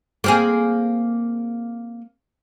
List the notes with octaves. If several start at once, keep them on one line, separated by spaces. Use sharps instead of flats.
A#3 C4 G#4